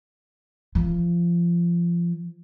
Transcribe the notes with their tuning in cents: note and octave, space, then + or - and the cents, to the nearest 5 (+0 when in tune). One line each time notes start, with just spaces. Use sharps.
F3 -25